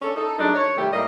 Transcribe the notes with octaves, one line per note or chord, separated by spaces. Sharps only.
C#4 D4 A4
D#4 A4
F#2 G#3 A3 D4 D#4
C#5
C3 D#3 G3 A3 G4
A2 G3 A#3 A#4 D#5